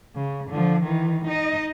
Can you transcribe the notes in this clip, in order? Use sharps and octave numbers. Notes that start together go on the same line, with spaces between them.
C#3
D3 F3
D#3 E3
D#4 D#5